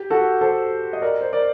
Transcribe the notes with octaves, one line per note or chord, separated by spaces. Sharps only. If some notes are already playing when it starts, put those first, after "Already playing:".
Already playing: G4
F#4 A4
A4 C5
D#5
A#4 D5
C5
A#4 D5